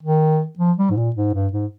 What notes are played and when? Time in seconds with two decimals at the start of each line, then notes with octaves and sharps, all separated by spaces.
0.03 D#3
0.59 F3
0.78 G3
0.91 G#2
0.97 A#2
1.16 G#2
1.34 G2
1.53 G#2